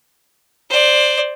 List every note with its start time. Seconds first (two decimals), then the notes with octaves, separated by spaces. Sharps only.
0.70 C5 D5